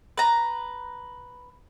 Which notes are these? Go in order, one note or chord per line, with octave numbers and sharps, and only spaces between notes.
B4 A#5